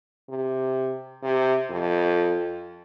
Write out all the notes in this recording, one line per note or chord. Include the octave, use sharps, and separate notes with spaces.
C3
C3
F2